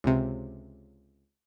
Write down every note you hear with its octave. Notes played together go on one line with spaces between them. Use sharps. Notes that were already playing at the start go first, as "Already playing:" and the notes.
C#2 C3